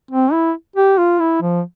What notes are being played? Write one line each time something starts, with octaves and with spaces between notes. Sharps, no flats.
C4
E4
G4
F4
E4
F3